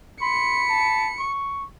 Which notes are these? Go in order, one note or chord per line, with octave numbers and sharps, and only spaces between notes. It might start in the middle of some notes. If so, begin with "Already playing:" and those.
B5 C6 C#7
A5
C#6